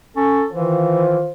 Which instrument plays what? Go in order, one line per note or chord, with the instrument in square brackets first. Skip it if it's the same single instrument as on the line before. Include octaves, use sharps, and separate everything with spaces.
[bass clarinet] C#4 [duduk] A4
[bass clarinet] D#3 [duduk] E3 [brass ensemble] F4 C5